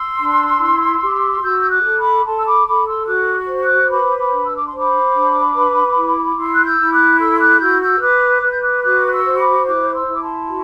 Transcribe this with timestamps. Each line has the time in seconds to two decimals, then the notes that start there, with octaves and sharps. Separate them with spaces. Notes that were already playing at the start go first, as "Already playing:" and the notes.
Already playing: C6 E6
0.19 D4
0.59 E4
1.02 G4
1.42 F#4 E6 G6
1.60 G6
1.70 D6 F#6
1.83 A4
1.97 B5 D6
2.24 A4 A5 C6
2.37 E6
2.45 B5 D6
2.66 A4 B5 D6
2.86 C6 E6
3.06 F#4 D6 F#6
3.47 C5
3.62 D6 F#6
3.89 B4 B5 D6
4.17 B5 D6
4.30 D4
4.45 E6
4.55 D6
4.67 C5 C6
4.78 B5 D6
5.13 D4
5.53 B4
5.95 E4
6.36 E4 C6 E6
6.54 F#6
6.63 E6 G6
6.78 E4
6.91 D6 F#6
7.19 A4 C6 E6
7.39 D6 F#6
7.59 F#4 E6 G6
7.80 E6 G6
8.00 B4 D6 F#6
8.42 B4 F#6
8.51 G6
8.60 D6 F#6
8.83 F#4 D6 F#6
9.06 F#6
9.11 C6 E6
9.25 C5
9.38 B5 D6
9.65 E4 D6 F#6
9.87 F#6
9.93 C6 E6
10.07 E4
10.14 D6
10.21 A5 C6
10.48 F#4